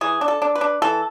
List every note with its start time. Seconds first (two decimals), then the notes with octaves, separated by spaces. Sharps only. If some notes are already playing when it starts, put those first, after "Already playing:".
0.01 E3 G#4
0.21 D4
0.28 A4
0.42 D4
0.55 B4
0.61 D4
0.82 E3 A4